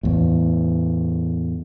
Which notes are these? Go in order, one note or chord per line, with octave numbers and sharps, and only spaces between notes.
E2 A2